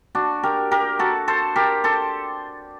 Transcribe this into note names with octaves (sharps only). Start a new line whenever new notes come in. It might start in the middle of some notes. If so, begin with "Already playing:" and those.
D4 F#4
G4 A#4
G4 A#4
F#4 A4
A4 C5
G4 A#4
A4 C5